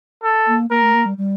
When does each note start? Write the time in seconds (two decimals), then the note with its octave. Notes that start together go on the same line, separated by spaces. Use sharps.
0.23 A4
0.47 A#3
0.70 A#3 A#4
0.82 A3
0.94 A#3
1.06 G3
1.18 G3